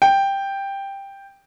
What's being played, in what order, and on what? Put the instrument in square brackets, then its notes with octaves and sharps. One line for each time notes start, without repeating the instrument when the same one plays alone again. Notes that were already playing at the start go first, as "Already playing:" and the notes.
[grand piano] G5